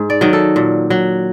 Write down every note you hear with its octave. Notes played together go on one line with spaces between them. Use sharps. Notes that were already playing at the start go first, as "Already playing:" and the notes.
Already playing: G#2
D5
D#3 F#3
A4
A#2
F#3